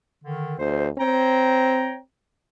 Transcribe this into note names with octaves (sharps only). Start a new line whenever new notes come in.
D3 D#3
D2 C5
C4 C#5 G5 A#5